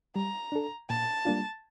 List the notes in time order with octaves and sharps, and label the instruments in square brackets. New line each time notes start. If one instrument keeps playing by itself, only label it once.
[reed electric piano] G3 [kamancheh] A#5
[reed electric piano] D4 A4
[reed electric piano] A#2 [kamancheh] A5
[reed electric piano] G3 A#3 D4 F4